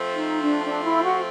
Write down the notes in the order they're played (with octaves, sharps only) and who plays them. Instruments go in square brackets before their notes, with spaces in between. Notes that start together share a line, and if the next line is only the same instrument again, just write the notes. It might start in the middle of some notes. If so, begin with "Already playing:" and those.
Already playing: [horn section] F3 A3 C4
[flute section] D#4
D4
D4
E4
F#4